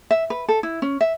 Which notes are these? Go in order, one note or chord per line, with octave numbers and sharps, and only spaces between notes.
E5
B4
A4
E4
C#4
E5